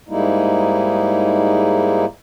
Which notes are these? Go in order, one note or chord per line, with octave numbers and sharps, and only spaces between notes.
G#2 G3 G#3 A#3 D#4 E4